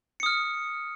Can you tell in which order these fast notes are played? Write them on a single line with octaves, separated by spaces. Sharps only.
C#7 D#6 F6